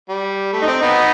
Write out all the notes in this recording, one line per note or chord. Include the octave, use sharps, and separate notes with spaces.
G3
A3
D#4
C4
B3 D#4